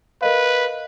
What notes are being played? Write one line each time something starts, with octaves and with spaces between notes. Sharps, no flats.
A#4 B4 D#5 F5